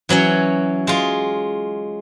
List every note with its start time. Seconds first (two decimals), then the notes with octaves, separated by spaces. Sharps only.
0.09 E3 F#3 C#4 C#5
0.87 G#3 F4